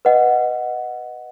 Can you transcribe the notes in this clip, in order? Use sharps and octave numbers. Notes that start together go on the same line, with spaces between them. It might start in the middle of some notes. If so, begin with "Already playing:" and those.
B4 D#5 F#5